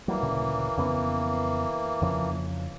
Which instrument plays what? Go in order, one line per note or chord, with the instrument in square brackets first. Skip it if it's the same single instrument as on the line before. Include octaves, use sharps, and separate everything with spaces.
[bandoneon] E3 A#3 [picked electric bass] F#3 G3
[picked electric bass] D2 A#2 C#3
F2 C#3 B3
F2 C#3 F3